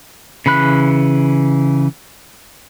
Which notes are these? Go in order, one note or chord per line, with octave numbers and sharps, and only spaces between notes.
C#3 E3 B5 F#6